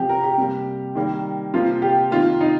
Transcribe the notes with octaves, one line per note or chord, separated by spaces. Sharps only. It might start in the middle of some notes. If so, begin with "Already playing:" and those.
Already playing: C3 F3 C4 G4
A#4
G4
C3 G3 A#3
D#3 G3 A#3
C3 F3 A#3 F4
G4
C3 D#3 A#3 F4
D#4